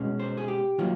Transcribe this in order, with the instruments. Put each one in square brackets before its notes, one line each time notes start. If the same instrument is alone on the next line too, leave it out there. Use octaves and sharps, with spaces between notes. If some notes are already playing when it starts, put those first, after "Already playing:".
Already playing: [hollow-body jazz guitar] B2 G#3 C#4
C5
G#4
G4
D#3 F#3 A#3 F4